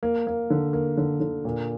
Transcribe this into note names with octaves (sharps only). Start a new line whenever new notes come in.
A#3
A#3
D3
A#3
D3
D3
A#2